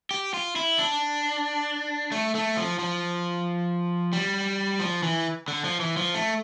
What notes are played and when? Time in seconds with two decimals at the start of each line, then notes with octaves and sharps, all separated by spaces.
0.11 G4
0.34 F4
0.56 E4
0.78 D4
2.12 A3
2.35 A3
2.57 F3
2.79 F3
4.13 G3
4.80 F3
5.03 E3
5.48 D3
5.65 F3
5.80 E3
5.97 F3
6.14 A3